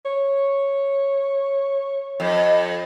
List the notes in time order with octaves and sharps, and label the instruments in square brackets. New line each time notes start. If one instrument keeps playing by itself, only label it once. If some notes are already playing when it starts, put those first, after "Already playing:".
[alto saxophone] C#5
[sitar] F2